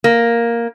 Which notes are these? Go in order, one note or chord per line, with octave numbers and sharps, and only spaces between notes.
A#3